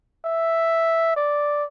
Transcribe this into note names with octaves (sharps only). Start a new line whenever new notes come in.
E5
D5